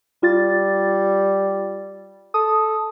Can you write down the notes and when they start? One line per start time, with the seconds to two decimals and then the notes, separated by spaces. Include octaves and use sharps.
0.23 G3 F4 A6
2.34 A4 D#6